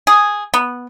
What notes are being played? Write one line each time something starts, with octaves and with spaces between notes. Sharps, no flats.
G#4
B3